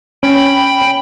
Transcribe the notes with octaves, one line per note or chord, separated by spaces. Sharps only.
C#4 G5 B5